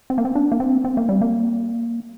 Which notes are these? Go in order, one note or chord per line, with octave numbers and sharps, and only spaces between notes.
C4
A#3
C4
D4
A#3
C4
C4
A#3
G3
A#3